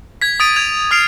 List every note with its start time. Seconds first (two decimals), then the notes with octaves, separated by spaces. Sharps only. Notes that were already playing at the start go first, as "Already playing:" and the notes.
0.22 G#6 B6
0.40 D#6 A6 D7 D#7
0.56 G#6 F7
0.91 D#6 F6 C7 D7 F7